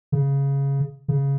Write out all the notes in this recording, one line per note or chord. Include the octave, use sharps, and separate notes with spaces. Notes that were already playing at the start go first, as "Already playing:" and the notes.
C#3
C#3